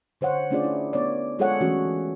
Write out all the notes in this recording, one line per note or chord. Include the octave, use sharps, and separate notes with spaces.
D3 C5 C#5 F#5
A3 C#4 D4 F4 G#4 D5
E4
B3 C#5 D5
G#3 F4 G#4 A4 C#5 F#5
E3 A3 C#4 F#4